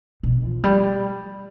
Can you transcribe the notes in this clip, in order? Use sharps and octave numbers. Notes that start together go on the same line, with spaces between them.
B2
F3
G3